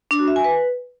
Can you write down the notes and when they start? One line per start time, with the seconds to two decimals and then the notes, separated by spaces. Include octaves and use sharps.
0.11 D4
0.19 F#4
0.28 E5
0.36 G#5
0.44 B4